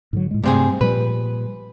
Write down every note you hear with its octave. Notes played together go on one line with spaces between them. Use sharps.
G#2 D3 F#3
A2 G#3
G2 C3 A3 C4 G#4
A#2 F3 G3 B4